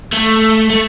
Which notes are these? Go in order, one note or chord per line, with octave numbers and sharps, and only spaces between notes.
A3
A3